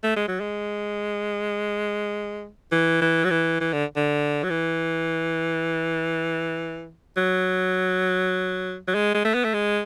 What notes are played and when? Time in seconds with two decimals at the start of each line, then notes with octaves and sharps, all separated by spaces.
0.04 A3
0.16 G#3
0.28 F#3
0.41 G#3
2.72 E3
3.02 E3
3.24 F#3
3.31 E3
3.61 E3
3.73 D3
3.96 D3
4.43 F#3
4.50 E3
7.17 F#3
8.88 F#3
8.95 G#3
9.15 G#3
9.25 A3
9.34 B3
9.44 A3
9.54 G#3